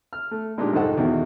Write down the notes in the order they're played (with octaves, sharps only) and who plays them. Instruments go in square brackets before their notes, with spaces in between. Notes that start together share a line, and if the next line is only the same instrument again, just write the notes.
[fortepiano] F6
A3
A#2 G#3 D4 D#4 G4
C2 F2 G#2 D#4 A4 F#5
E2 B2 D#3